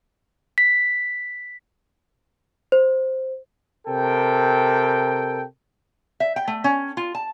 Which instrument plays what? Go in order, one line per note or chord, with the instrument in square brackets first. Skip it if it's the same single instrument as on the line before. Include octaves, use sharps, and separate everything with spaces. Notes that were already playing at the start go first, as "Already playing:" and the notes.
[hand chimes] B6
[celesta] C5
[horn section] C3 A4 A#4 G5
[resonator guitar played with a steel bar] E5
G5
A3
C#4
F4
A5